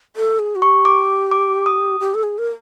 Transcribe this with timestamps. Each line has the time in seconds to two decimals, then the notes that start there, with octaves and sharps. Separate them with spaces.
0.16 A4
0.39 G#4
0.55 F#4
0.62 G4 C#6
0.85 D6
1.31 D6
1.66 D#6
2.00 G4
2.14 A4
2.23 G#4
2.38 A#4